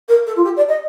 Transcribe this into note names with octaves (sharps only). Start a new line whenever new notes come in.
A#4
A4
F4
G4
D5
D#5